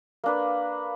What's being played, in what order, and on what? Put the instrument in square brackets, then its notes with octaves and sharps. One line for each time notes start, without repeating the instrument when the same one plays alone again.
[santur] A#3 D4 B4